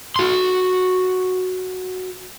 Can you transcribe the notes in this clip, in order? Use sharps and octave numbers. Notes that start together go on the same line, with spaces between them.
F#4 C6